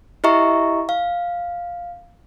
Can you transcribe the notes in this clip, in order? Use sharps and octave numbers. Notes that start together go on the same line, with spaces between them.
E4 G4 D#5 E5 A#5 C#6
F5